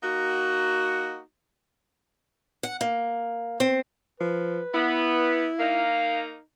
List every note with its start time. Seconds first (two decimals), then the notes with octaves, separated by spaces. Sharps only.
0.02 A#3 D#4 F#4
2.63 F#5
2.81 A#3
3.60 C4
4.20 F3 B4
4.74 B3 E4
5.59 A#3 D#4 F5